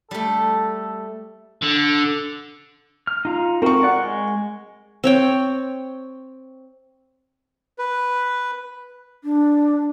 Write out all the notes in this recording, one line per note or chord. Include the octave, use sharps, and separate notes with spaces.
G3 A3 A4
D3
F6
D#4 F4 A#5
C4 F#4 A#4 C#6
D5 F#5
G#3
C4 C#5 G5
B4
D4